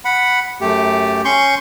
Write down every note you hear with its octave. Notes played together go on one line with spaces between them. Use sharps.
F#5 B5
F#2 A3 G4
C#4 C6 C#6 G6